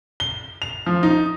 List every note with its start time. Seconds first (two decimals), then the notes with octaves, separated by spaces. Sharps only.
0.20 G7
0.62 F7
0.86 F3
1.03 D#4